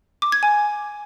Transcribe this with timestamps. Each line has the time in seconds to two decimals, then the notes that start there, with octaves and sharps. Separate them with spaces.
0.22 D6
0.32 G#6
0.43 G#5